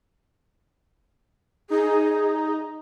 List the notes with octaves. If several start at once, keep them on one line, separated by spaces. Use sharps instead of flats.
D#4 G#4